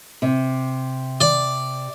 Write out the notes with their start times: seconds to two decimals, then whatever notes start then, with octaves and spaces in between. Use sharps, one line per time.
0.22 C3
1.21 D5